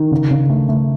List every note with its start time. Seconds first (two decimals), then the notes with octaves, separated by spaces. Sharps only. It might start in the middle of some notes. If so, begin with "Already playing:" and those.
Already playing: D#3
0.12 C#3
0.31 C#3
0.50 A3
0.69 A3